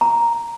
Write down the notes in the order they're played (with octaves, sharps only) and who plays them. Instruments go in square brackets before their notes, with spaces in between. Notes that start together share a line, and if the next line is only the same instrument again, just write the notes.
[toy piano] A#5